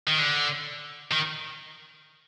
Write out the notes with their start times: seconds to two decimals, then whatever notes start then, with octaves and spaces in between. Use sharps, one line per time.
0.08 D#3
0.18 D3
1.11 D#3